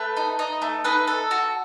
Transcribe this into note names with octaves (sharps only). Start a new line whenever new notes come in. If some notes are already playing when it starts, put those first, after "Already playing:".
Already playing: A3 B4
D#4
D#4
A3
D#4 B4
A4
F#4